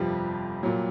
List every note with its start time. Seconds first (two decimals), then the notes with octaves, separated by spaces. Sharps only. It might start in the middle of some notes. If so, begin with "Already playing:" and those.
Already playing: G1 F2 C3 F3 G3 G4
0.63 A#2 F#3